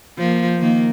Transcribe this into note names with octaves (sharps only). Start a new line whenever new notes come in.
F3 A#3
D#3 A#3